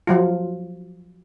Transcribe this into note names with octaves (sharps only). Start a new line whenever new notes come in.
F3 F#3 F4